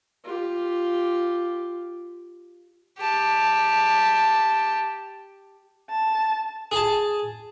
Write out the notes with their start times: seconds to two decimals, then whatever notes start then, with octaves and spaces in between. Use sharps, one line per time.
0.24 F4 G4
2.99 G4 A5
5.90 A5
6.72 G#4 A5